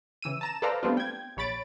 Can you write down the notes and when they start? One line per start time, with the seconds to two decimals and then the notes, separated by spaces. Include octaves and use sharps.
0.22 C#3 E3 E6 D#7
0.41 A5 A#5 E7
0.62 A4 B4 C5 D5 F5 A#5
0.83 G3 A3 B3 C4 D4 F4
0.97 G5 G#6
1.37 A#1 C#5 B5 A6 D7